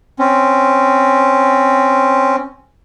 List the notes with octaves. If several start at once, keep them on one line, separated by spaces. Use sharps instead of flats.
C4 C#4